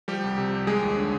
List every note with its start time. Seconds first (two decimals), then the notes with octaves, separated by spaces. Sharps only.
0.08 F3 G3 G4
0.24 C2
0.38 C3
0.53 C2
0.67 G#3 G#4
0.83 D#2
0.97 D3